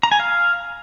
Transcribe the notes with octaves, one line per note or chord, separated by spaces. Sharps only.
A#5
G#5
F5